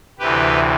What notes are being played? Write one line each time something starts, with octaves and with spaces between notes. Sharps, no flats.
D2 C3 E3 G4 B4